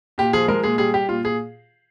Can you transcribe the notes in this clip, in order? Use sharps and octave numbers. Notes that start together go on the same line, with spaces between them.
A#2 G4
F3 G#4
G#3 A#4
A#2 G#4
G3 G#4
G3 G4
A#2 F4
A#2 G#4